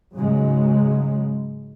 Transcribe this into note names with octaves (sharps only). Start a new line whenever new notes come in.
G#2 C#3 F#3 G#3